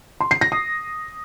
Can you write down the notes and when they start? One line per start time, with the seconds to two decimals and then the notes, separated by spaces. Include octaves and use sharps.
0.21 C6
0.31 C7
0.41 A#6
0.52 D#6